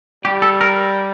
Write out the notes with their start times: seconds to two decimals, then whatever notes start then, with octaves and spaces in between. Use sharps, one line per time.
0.25 G3 G4
0.42 A4
0.61 A#4